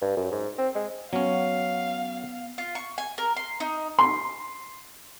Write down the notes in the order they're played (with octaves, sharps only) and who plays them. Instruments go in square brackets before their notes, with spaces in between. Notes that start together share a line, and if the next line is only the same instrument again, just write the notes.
[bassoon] G2
F#2
G#2
C4
G#3
[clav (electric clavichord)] F#3 C#4 [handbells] B3 [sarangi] F5
[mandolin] F4
C#6
G#5
A#4
C6
D#4
[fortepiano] C6